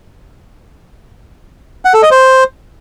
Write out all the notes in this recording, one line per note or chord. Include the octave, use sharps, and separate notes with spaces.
F#5
A4
D#5
C5